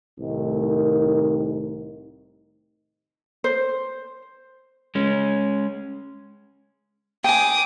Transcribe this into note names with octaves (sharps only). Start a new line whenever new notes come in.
C2 A2 D#3
C5
G#3 C#4
G5 G#5 D6 D#6